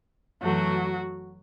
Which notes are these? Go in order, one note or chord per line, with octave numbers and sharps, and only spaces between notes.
F#2 E3 F#3 A3 F#4